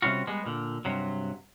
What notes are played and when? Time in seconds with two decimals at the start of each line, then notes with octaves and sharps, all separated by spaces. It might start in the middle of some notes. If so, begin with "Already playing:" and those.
0.02 C3 G3 C#4 F4 F#4
0.27 G3 G#3 B3
0.46 A#2 D3
0.85 G2 C3 F#3